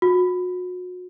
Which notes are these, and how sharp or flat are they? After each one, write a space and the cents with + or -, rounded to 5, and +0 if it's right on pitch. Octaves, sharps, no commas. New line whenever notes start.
F#4 -35